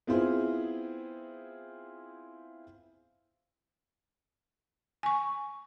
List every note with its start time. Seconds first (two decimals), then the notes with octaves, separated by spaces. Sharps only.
0.07 B3 C4 E4 F4 G#4 C5
5.03 G#5 C#6